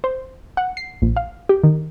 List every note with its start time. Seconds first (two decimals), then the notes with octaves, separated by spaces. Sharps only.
0.04 C5
0.57 F#5
0.77 C7
1.02 A#1
1.16 F5
1.49 G4
1.63 D#3